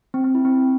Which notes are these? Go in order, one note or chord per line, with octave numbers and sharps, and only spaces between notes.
C4
C4
E4
C4